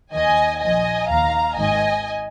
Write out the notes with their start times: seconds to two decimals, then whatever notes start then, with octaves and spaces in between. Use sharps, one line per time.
0.14 D#2 D#3 D#5 G#5
0.61 A#1 A#2 F3 D#5 G#5
1.09 D#2 D#3 F5 A#5
1.57 G#1 G#2 D#3 D#5 G#5